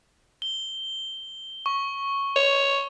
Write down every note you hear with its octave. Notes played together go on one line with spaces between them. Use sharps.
G7
C#6
C#5